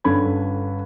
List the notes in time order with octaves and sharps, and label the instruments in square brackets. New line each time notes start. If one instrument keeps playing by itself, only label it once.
[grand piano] G1 D3 C#4 A4 B5 G#6